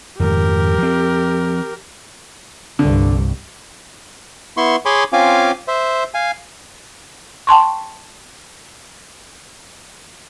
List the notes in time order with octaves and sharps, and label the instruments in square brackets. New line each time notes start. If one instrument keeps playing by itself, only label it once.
[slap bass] F2 G#2 D#3 [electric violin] G4 A#4
[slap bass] F3 C4
[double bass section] C2 G2 [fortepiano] D3
[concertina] B3 E4 C6 C#6
G#4 C#5 G#5 B5 C6 D6
C4 C#4 F4 F5 G#5 D6
C5 E5
F5 G#5
[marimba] G5 A5 C6 C#6